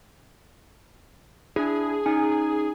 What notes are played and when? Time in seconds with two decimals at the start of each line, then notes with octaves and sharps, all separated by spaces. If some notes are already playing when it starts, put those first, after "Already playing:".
1.56 D4 E4 G#4
2.06 C#4 D#4 G#5